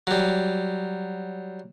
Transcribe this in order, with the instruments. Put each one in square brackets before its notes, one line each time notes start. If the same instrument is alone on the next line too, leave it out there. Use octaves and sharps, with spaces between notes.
[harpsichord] F#3 G3